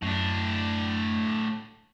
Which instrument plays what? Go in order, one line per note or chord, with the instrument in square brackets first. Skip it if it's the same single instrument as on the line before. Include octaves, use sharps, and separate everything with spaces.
[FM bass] F#2 [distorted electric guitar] A2 D4